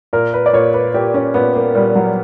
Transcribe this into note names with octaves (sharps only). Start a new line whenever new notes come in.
A#2 A#4
B4
D5
A#2 C#5
B4
A#2 G4
C#4
A#2 B3
A#3
A#2 G3
F#3